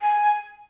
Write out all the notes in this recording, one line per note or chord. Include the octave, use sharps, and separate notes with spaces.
G#5